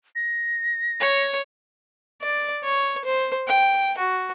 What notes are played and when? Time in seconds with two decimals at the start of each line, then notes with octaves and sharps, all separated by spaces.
0.15 A#6
1.00 C#5
2.22 D5
2.63 C#5
3.04 C5
3.48 G5
3.98 F#4